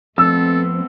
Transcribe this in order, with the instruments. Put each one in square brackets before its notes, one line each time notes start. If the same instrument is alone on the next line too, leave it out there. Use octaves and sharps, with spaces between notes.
[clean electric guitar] F2 [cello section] A3 B3 C4 [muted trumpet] A4 [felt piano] E6